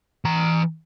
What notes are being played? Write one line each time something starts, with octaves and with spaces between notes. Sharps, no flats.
E3 A#5